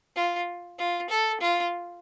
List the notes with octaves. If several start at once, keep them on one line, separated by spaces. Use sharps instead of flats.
F4
F4
A4
F4